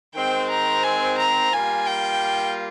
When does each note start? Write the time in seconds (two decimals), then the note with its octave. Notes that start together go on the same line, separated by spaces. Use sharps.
0.15 D#3 G#3 C4 G5
0.50 A#5
0.83 G#5
1.18 A#5
1.52 G3 A#3 F4 G#5
1.86 G5